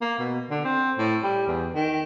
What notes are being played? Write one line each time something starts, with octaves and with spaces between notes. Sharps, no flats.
A#3
B2
D3
C4
A2
G3
E2
D#3